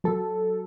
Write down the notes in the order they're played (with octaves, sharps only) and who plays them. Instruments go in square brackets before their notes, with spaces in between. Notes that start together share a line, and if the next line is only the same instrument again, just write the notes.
[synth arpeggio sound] F#3 A4